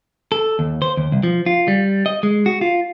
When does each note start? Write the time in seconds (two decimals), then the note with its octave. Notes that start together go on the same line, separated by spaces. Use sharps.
0.32 A4
0.59 D#2
0.82 C5
0.97 D#2
1.12 C2
1.23 F3
1.46 F4
1.68 G3
2.06 D#5
2.23 G#3
2.46 F#4
2.61 F4